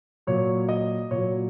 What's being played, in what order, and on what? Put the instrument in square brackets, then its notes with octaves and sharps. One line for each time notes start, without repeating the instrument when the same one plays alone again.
[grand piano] A#2 F#3 C#5
D#5
A#2 F#3 C#5